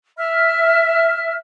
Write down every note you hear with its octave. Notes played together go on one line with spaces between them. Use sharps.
E5 F6